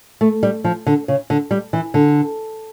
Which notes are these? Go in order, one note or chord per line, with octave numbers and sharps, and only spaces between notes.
A3
G3
F3
D3
C#3
D3
G3
E3
D3